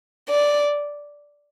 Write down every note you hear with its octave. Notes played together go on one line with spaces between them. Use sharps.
D5